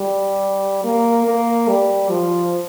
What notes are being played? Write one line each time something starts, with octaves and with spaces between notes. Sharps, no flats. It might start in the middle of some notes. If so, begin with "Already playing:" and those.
Already playing: G3
A#3
A#3
G3
F3